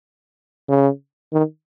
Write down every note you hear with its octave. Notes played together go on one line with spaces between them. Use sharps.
C#3
D#3